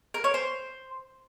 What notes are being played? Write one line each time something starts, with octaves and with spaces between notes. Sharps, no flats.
A#4
C#5
C5